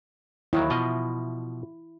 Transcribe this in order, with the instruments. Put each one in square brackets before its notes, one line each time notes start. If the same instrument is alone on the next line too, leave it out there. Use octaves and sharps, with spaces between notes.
[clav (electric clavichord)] D#2 D#3 F#3 [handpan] E4
[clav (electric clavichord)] B2 F3 D#5